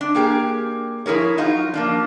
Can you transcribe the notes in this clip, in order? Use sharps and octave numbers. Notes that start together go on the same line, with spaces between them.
D4
A#3 G4 G#4
F3 E4 G#4 A#4 C#5
F#3 D#4 F4 F#4
F3 A#3 D4